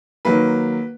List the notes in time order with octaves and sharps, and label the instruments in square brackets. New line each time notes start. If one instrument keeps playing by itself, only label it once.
[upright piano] D#3 F#3 A#3 B4